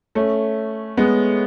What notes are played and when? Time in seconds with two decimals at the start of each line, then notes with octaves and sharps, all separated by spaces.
0.15 A3 C#4
0.97 G#3 B3